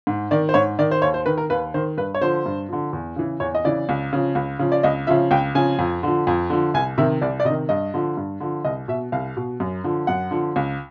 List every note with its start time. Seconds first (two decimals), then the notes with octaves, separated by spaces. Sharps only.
0.07 G#2
0.31 D#3 D5
0.49 C5
0.54 G#2 C#5
0.79 D#3 D5
0.91 C5
1.02 D#2 C#5
1.14 C5
1.26 D#3 B4
1.38 A#4
1.50 D#2 B4
1.74 D#3 C5
1.98 G2 B4
2.15 C#5
2.21 D3 F3 C5
2.46 G2
2.69 D3 F3
2.93 E2
3.16 C#3 E3
3.40 E2 C#5
3.55 D#5
3.64 C#3 E3 D5
3.89 C#2
4.13 C#3 F3
4.35 C#2
4.59 C#3 F3
4.72 D5
4.83 C#2 D#5
5.07 C#3 F3 E5
5.31 C#2 G5
5.55 C#3 F3 G#5
5.79 F2
6.03 D3 F3
6.27 F2
6.50 D3 F3
6.74 C2 G#5
6.98 C3 D#3 E5
7.22 C2 D5
7.40 D5
7.45 C3 D#5
7.50 D#3
7.69 G2 D#5
7.94 D3 F3
8.17 G2
8.40 D3 F3
8.64 C2 D#5
8.88 B2 E5
9.12 C2 F5
9.37 B2
9.60 F#2
9.84 D3 F3
10.07 F#2 F#5
10.31 D3 F3
10.56 C#2